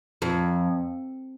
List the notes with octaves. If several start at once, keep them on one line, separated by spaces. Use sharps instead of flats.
F2